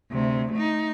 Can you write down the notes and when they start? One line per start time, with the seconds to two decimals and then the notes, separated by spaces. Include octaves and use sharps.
0.12 D2 C3
0.53 A3 D#4